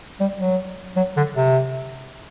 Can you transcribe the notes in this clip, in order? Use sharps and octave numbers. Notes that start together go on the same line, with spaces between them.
G3
F#3
F#3
D3
C3